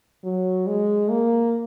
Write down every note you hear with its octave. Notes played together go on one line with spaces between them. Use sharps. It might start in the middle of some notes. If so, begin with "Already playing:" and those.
F#3
G#3
A#3